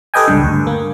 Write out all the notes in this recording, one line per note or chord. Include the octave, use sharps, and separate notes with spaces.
G4 A4 B4 D#5 G5 G#5
C#2 G2 D3
D2 G2
A#3